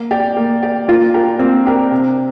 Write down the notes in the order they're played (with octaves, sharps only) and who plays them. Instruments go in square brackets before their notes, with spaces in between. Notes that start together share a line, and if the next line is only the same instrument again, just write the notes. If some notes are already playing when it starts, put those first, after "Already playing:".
Already playing: [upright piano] A#3
G4 D5
A#3
G4 D5
[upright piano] A#3 [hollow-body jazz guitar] F4
[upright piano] D4 G4 A#4
[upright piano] A#3 [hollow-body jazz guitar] C4
[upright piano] D4 G4 A#4
C3